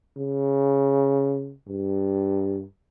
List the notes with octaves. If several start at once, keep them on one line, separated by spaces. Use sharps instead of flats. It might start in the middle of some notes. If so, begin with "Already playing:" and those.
C#3
G2